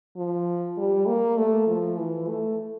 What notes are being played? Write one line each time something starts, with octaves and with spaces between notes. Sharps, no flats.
F3
G3
A#3
A3
F3
E3
A3